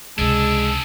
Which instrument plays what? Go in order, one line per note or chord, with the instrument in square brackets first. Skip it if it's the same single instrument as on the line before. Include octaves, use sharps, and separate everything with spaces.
[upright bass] C#2 C3 [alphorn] G#3 [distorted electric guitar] D4 G#4 [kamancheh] A5 E6